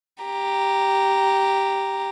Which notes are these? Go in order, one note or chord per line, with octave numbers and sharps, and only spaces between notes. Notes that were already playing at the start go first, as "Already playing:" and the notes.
G4 A#5